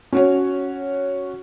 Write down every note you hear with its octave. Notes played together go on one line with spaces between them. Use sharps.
C#4 F#4 C#5